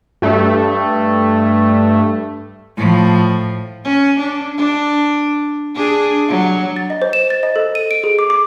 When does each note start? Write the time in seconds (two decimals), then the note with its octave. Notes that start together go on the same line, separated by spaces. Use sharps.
0.22 G2 A3
2.77 A2 F3
3.84 C#4
4.19 D4
4.57 D4
5.75 D4 G#4
6.28 F#3
6.76 A6
6.90 D#5
7.02 C5
7.13 E7
7.30 A6
7.43 D#5
7.56 A4
7.75 D#7
7.91 D7
8.04 G#4
8.19 D6
8.30 D6